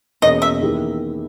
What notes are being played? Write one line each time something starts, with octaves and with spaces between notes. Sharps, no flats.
E2 B2 A#3 C#4 D#5
E5
E2 D#3 A#3 E4 G4